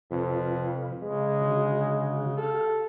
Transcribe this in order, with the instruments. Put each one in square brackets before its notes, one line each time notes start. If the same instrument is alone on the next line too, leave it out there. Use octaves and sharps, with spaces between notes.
[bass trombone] F2 [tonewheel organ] C3 F4 B4
[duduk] C#3 [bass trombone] G#3
[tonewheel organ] D3 F#4
[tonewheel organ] G4 F5 [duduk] A4